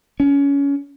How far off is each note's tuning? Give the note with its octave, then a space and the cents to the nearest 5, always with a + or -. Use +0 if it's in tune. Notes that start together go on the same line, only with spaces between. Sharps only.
C#4 +20